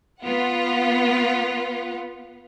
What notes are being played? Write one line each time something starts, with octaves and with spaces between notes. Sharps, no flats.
B3 F4 F#5